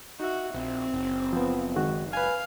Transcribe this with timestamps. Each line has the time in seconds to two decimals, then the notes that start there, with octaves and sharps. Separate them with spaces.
0.20 D#4 F#4 E5
0.54 A#1 C4
0.94 F#1
1.33 F3 B3
1.76 D#3 G#3 F#4
2.13 B4 F5 G#5